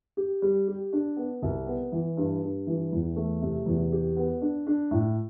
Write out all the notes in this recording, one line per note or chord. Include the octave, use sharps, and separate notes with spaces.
G4
G3
G4
D4
B3
C2
B3
E3
G2
G2
E3
E2
A3
C3
E2
G4
B3
D4
D4
A2